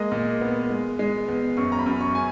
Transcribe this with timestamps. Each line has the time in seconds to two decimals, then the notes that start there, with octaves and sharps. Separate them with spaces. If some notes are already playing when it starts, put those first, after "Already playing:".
Already playing: G#3 A#3 D#5
0.12 A#2
0.41 B3
0.70 G#3
0.99 G#3
1.28 E2
1.57 F#2 C#6
1.72 A#5
1.79 B5
1.86 F#2
2.00 C#6
2.15 G#5